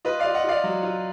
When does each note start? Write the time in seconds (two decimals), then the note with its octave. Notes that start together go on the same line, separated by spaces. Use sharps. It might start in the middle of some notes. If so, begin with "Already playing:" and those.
0.05 F4 B4 D#5
0.19 F4 D5 F5
0.35 D#5 F#5
0.44 F4 D5 F5
0.64 F#3
0.83 F4